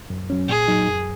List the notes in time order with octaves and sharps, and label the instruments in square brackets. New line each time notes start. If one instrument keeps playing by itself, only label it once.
[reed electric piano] F#2
F#3 C#4
[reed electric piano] A#2 [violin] G#4
[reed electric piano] F#3 D#4
F#2